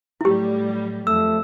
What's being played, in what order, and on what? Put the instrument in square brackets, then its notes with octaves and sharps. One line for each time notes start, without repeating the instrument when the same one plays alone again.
[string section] A2 F#3 G3 [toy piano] E4 G4
[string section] F2 [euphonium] A3 [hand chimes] E6